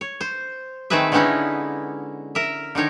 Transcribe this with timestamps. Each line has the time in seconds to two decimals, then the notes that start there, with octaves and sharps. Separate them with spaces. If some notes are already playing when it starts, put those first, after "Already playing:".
0.01 C#5
0.21 C5
0.90 D#3 A3 C4 G#4 B4 E5
1.12 D3 G#3 B3 C#4 D#4 E4
2.35 A#4 E5
2.75 D3 D#3 D#4 C#5